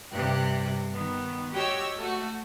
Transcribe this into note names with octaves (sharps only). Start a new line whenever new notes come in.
G2 C3 G4 F#6
D#3 B3
F#4 G4 C#5 D#5 G5 E6
A3 F#4